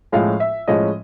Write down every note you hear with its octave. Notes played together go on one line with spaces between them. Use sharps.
A2 F3 G#3 C#4 F5
E5
A2 F3 G#3 C#4 D#5